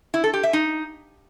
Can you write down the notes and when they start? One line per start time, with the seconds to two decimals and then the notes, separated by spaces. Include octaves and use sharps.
0.14 E4
0.24 A4
0.34 G4
0.43 E5
0.53 D#4